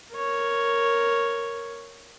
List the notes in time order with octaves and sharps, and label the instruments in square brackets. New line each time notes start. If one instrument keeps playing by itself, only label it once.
[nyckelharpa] A#4 C#5